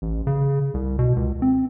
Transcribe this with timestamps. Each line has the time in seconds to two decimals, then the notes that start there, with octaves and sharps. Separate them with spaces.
0.02 A1
0.27 C#3
0.74 C2
0.99 B2
1.16 C#2
1.42 C4